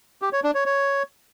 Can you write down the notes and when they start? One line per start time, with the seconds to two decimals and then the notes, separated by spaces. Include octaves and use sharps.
0.22 G4
0.33 C#5
0.44 D4
0.55 C#5
0.66 C#5